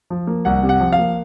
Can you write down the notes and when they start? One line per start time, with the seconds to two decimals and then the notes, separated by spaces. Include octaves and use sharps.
0.10 F3
0.27 A#3
0.45 C2 F#5
0.63 C3
0.69 F#5
0.80 F3
0.92 F5
0.98 A#3